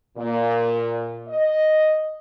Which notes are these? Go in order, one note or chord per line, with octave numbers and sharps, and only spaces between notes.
A#2
D#5